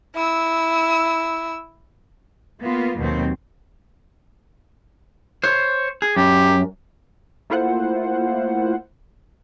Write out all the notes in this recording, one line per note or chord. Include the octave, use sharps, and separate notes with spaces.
E4 E6
A#3 B3 F4
D#2 B2 F#3 C4
C5 C#5
G#4
F#2 G4
A3 A#3 E4 F4 C5 F#5